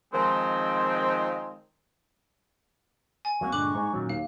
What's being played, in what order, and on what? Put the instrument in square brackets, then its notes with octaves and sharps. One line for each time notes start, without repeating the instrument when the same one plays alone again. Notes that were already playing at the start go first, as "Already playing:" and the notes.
[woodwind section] D#3 F3 G#3 C4
[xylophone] G#5
[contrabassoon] C2 [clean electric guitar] F#3 A#3 F#4 [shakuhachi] C#6
[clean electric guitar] G2 A#2 G#3 [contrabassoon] D3 [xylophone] D6 F#6 F#7
[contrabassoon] G#2 [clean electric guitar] D#4 G#5
[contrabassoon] F#2 [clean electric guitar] A#2 D#3 F#3
[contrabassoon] D#2 [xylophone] F5